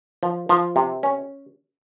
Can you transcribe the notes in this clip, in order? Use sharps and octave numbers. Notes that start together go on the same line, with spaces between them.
F3
F3
C3
C#4